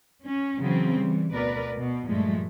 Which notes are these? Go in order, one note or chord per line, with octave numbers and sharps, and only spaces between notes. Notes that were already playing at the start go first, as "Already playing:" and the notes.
C#4
C#3 E3 F#3 C4
E3 G3
D2 B2 A#4 B4 D5
B2
G2 A#2 F3 G#3 A3